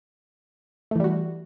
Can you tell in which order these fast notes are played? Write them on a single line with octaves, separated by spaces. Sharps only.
A3 E3 G3 F#4